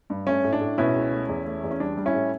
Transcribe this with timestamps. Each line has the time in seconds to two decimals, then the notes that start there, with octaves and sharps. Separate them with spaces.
0.10 G2
0.27 A3 C#4
0.44 A2
0.53 D4
0.61 A2
0.78 B2 C#4 E4
0.95 C#2
1.12 A3
1.29 E2
1.46 A3
1.63 E2
1.71 C#4
1.80 G3 D4
1.97 G3
2.06 C#4 E4
2.14 A2